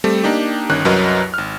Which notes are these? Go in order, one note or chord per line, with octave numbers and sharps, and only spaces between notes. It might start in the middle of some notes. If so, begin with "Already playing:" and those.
G3 A3 C4 A4
A#3 D4 D#4 G4
G1 D#3 C#4 F#6
C2 F#2 F#3 A#4 B4 D#5
G#1 F6